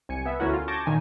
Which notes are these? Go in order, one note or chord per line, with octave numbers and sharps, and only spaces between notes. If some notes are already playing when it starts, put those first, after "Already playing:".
C2 G#5 C#7
B3 E5
D2 A3 C#4 E4 F#4 A#4
F4
A5 C#6 D6 G6 G#6 A#6
A#2 D#3 G#5